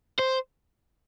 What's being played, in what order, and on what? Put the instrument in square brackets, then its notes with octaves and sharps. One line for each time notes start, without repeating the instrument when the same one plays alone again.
[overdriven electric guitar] C5